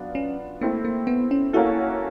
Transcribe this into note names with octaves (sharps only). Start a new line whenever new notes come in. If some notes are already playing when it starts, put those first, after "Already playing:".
Already playing: F#3 B3 D4 F4
C#4
A3 A#3 C4 E4
A#3
B3
C#4
A#3 C#4 E4 F#4 A4